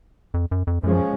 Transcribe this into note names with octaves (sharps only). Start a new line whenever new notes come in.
F2
F#2
F2
F#2 F3 G#3 C#4